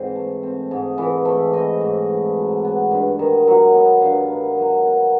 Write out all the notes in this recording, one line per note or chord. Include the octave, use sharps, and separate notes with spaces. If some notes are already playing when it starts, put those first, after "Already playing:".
Already playing: G#2 E3 C4 C5
A3
C4
G#2
E3
A3
C4 D#5
G#2
E3
F#3
B3
G2
D#3
F#3
B3
G2 F5
D#3
F#3
B3